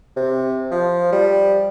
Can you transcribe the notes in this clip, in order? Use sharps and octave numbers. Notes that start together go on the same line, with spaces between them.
C3
F3
G3